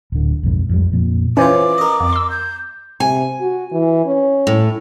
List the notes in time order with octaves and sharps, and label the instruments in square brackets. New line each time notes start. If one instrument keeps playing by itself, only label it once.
[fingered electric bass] D1 D3
B1 F2 G#2
F2 G#2 G3
F2 A#2 F3
[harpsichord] E3 F4 [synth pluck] C#4 C5 C#5 [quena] D6
[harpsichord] A#4 D#5
[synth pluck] F2
C6 E6
[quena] G6
[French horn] C3 [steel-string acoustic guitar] G#5
[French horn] F#4
E3
C#4
[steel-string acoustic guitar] A2